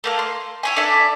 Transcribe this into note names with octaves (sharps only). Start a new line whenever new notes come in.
A3 A#3 F5
C6
E4 C#5 G#5
D4 A4 D5 E5